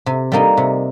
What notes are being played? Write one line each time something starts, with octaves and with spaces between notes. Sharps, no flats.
C3
G3 A#3 D#4
C3